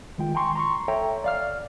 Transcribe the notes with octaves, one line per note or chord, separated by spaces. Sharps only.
D#3 G#3 F4 G5
G5 G#5 A#5 C6 C#6
A#5 C6 C#6
A4 C#5 E5 G5 A#5
D5 F5 F6